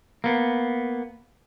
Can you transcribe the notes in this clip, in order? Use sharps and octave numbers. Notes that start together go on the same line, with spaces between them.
A#3 B3